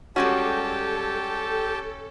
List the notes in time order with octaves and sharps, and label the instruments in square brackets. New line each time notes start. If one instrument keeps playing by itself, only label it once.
[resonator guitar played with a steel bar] G3 G#3 F#4 [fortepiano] C#4 [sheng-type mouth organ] G4 G5 A5 [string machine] A4